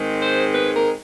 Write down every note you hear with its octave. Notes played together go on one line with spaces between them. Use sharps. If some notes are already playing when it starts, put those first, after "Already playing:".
Already playing: G#2 D#3 G#3 C4
C5
B4
A#4